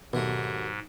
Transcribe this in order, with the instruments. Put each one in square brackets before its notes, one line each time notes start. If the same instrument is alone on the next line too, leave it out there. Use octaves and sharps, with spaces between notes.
[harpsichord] D#2 F#3 A3 [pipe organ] G#2 [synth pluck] B2